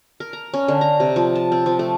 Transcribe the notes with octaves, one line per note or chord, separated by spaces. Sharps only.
A#4
A#5
C#4
D3
A#5
C3
F3
A5
C4
F3
A3